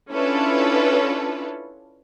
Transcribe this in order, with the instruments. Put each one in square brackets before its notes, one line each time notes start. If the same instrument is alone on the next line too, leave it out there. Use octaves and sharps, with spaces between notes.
[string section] C#4 D4 E4 F4 A4 B4